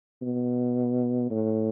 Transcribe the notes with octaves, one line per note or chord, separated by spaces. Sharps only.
B2
A2